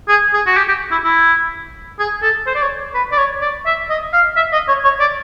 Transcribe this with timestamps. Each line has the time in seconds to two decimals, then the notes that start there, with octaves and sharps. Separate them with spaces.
0.08 G#4
0.33 G#4
0.46 F#4
0.57 G4
0.68 G4
0.91 E4
1.04 E4
1.99 G#4
2.22 A4
2.46 C5
2.55 D5
2.62 C#5
2.94 B4
3.12 D5
3.17 C#5
3.41 D5
3.66 E5
3.90 D#5
4.13 F5
4.36 E5
4.52 D#5
4.68 C#5
4.84 C#5
5.00 D5